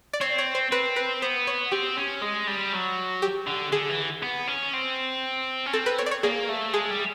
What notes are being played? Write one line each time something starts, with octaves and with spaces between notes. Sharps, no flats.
D5
C4 C#5
C#5
C5
C4 B4
B4
B3 C5
C#5
C4 G4
C#4
G#3
G3
F#3
G4
D3
D3 G#4
E3
B3
C#4
C4
C#4
C4 A4
B4
C#5
D5
C#5
A#3 G#4
A3
G#3 G#4
G3